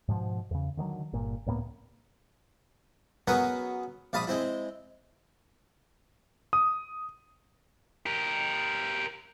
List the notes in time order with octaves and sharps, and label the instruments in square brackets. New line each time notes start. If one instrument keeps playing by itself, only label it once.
[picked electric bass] G#2 B2 F3
E2 C#3
D3 D#3 F3 F#3
G1 A#2
C#2 A2 A#3 B3
[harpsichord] F#3 B3 C#4 G#4 A#4 B4
A#1 F5 A5 B5 D#6
G#3 C4 E4
[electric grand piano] D#6
[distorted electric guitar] G4 A#4